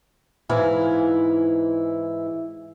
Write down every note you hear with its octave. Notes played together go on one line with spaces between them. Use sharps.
G#2 E3 E4 F5 G#5